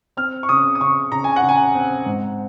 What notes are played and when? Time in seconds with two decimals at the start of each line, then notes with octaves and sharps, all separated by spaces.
0.17 C4 F6
0.43 C#6
0.49 C#3 D#6
0.75 D#6
0.80 C#3 C#6
1.12 C#3 A#5
1.24 G#5
1.36 F#5
1.43 C#3
1.49 G#5
1.75 C4
2.06 G#2